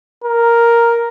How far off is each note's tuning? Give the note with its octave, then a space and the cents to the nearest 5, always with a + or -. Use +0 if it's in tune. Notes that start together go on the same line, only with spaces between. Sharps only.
A#4 +0